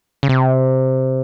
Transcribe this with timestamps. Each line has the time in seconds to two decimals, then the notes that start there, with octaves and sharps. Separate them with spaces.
0.23 C#3
0.29 C3